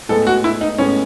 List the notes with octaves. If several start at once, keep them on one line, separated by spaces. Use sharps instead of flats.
A2 G#3 B3 A4
F#4
E4
D#4
A2 G#3 B3 C#4